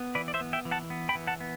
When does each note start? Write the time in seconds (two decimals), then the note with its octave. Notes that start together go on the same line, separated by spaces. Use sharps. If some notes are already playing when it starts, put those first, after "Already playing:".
Already playing: B3
0.15 E3 B4 D5
0.28 D5
0.34 C5 E5
0.40 B3
0.53 E5 G5
0.65 E3
0.71 F#5 A5
0.90 B3
1.09 G5 B5
1.15 E3
1.27 F#5 A5
1.40 B3